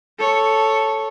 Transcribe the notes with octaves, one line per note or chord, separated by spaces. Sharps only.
A4 C#5